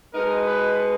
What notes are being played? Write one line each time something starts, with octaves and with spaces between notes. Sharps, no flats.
B2 G#3 B3 D#4 A#4
B4